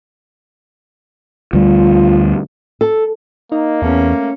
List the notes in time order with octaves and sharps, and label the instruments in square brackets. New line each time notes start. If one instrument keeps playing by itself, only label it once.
[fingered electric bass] D2 G3 [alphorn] F4
[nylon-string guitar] A4
[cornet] A#3 [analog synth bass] D#4
[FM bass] E2 [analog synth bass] A3 [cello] C#4